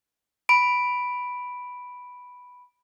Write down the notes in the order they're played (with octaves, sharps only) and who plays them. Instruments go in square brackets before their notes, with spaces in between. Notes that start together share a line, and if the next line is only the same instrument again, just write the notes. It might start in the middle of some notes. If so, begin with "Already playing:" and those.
[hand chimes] B5 D7